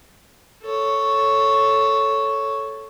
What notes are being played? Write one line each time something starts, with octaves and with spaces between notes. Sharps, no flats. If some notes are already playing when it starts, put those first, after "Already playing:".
A4 C#5